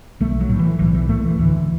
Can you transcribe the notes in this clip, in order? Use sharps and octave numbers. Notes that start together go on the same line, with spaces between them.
B1 A3
F#3
A2
D3
E3
B1 E3
E3
A2 A3
E3
D2 E3